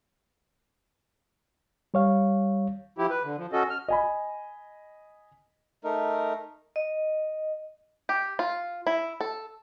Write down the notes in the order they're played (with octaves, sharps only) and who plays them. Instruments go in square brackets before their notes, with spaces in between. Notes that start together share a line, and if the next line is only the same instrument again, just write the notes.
[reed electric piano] G3 C#5 F5
[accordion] F3 E4 G4
B4
D3
F3
C#4 F#4 A4 D#5
F6
[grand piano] D#5 G#5 B5
[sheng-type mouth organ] A3 D#4 A#4
[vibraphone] D#5
[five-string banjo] G4
F4
E4
A4